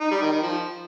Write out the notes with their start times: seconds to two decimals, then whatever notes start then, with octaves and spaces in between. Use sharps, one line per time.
0.01 D#4
0.11 G3
0.22 D#3
0.32 D#3
0.42 F3